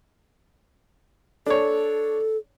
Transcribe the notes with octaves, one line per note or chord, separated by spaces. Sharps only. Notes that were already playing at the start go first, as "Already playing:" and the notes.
D4 A4 C#5